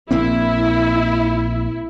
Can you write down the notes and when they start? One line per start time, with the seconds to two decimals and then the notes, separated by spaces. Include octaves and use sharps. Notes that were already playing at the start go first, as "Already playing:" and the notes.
0.11 A#1 A#3 C4 E4